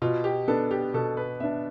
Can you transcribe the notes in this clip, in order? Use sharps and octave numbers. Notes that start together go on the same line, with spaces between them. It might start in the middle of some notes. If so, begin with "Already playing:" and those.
B2 F4
G4
B3 D4 A4
G4
B2 A4
B4
B3 D4 E5